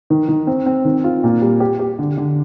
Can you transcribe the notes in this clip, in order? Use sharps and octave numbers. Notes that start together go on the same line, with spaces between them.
D#3
D#3
C4
C4
D#3
F4
A#2
G3
G4
G4
D3
D3